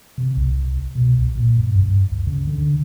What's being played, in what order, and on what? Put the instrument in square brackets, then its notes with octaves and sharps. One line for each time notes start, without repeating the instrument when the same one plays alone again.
[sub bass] C3
C2
B2
C2
A#2
G2
G2
D2
C#3
D3